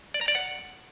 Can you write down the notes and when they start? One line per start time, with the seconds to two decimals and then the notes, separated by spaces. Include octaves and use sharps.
0.14 D5
0.21 A#5
0.28 D5
0.35 F#5